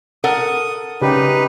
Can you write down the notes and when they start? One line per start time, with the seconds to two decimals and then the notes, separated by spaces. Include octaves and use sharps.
0.24 A4 A#4 F#5 D#6
1.02 C#3 D#4 G4 B4